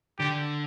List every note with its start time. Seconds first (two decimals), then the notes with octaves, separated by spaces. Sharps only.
0.19 D3 G4